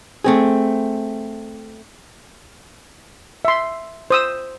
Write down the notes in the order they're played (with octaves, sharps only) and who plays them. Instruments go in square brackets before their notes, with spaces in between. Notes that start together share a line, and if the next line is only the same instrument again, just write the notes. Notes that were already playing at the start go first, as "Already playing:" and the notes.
[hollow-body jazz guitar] A3 C4 G#4
[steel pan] E5 C6
C5 D#6 E6